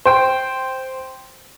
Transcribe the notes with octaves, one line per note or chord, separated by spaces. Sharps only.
C5 G5 C6